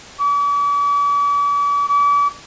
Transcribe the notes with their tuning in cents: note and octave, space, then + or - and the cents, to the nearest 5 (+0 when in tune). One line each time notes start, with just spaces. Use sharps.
D6 -45
D6 -40